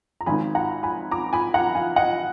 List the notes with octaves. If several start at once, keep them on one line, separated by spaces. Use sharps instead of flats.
A#5
G#1 G#2 D#3 G#5 B5
F#5 A#5
G#5 B5
A#5 D6
G#5 B5
F#5 A#5
F5 G#5
D#5 F#5